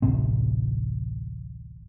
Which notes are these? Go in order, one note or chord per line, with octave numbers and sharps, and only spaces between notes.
D1 A1 C3 C4